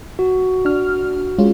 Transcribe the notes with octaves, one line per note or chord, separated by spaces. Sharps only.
F#4
D4 F6
G#3 C#4 F4